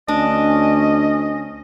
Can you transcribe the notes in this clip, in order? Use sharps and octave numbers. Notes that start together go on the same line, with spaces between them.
D2 C#4 D4 D#5